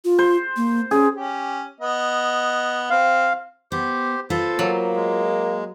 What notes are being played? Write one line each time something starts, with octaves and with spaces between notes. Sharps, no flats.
F4
C5
A#3
C#4 G#4
C#4 G4
B3 D#5
C4 F5
B3 G4 C5
F4 A4 B4 C5
F#3 A#3
G#3